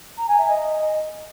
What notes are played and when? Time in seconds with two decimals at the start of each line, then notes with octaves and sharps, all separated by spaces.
0.17 A#5
0.28 G#5
0.38 E5
0.48 D#5